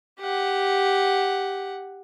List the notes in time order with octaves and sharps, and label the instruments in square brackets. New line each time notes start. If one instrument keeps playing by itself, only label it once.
[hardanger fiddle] G4 F#5